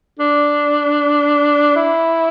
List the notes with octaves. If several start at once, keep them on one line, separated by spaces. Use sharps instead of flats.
D4
E4